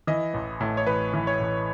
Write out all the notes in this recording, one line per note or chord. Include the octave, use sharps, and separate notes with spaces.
E3 D#5
A1
A2
C#5
A1 B4
E3
C#5
A1